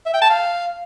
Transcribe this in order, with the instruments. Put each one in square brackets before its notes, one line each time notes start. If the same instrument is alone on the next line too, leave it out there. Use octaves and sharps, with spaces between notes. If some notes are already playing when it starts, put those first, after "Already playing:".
[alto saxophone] E5
G5
A5
F5